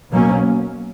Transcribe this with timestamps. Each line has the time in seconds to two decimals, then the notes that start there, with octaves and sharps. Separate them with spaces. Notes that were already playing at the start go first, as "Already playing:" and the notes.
0.11 B2 F#3 A#3 C#4